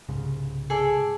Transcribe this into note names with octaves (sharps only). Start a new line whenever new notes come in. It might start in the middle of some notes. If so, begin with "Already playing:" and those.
C2 G#2 C#3
G#4 A4 D5